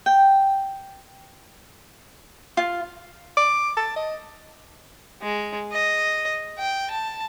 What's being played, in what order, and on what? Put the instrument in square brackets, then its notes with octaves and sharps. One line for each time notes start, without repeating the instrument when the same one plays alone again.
[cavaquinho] G5
F4
[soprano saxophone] D6
A5
D#5
[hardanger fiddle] G#3
D#5
G5
A5